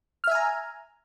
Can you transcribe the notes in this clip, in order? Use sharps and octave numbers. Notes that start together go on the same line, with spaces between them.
E5 G#5 A#5 F6